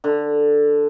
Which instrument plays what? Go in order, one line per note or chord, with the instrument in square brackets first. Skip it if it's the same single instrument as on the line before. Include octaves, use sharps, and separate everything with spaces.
[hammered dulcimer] D3